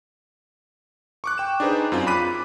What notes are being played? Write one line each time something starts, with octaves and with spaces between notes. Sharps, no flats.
C#6 D6 F#6
G5 E7
D4 D#4 G#4 B4 C5
F#2 C4 F4
B5 D6 F#6 B6 D#7